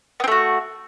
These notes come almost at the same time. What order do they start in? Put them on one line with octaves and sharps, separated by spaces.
B3 C4 A3 F#4